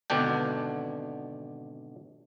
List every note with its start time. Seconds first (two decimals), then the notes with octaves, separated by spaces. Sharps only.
0.10 G#1 B2 D3 D4 G5